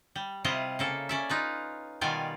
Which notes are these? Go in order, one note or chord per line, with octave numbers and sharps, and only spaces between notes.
G3
C3 G3 E4 F4 D#5
C#3 A#3 A4
C#4 D5 E5
D#4 F4 B4
B2 D#3 G3 F4 D5 G#5